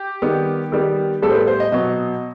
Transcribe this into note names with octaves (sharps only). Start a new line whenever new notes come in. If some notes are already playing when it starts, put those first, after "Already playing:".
Already playing: G4
D#3 G3 B3
D#3 G3 B3
A2 G3 B3 A4
C5
B4
C5
D#5
B2 F#3 B3 D#5